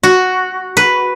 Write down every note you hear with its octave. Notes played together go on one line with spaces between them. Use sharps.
F#4
B4